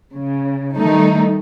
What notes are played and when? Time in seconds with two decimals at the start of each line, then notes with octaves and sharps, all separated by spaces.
0.14 C#3
0.77 D#3 G3 A3 D#4